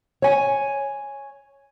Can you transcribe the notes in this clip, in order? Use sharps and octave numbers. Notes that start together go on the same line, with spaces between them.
C#5 G#5